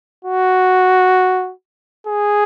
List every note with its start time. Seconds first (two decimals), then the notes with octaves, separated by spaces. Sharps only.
0.25 F#4
2.07 G#4